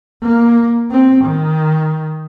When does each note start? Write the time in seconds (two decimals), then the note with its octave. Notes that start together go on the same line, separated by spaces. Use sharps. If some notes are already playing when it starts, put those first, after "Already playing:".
0.22 A#3
0.91 C4
1.24 D#3